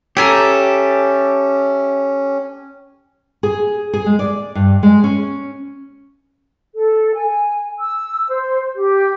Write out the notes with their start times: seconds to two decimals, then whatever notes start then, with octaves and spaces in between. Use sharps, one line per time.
0.17 C#4 G4 A4 E5 G#5 A#5
3.43 G#4
3.93 G#4
4.06 G#3
4.19 D5
4.55 G2
4.83 G#3
5.04 C#4
6.75 A4
7.15 G#5
7.79 E6
8.28 C5
8.75 G4